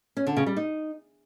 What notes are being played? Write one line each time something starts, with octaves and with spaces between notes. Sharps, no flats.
C#4
D3
C#3
G3
D#4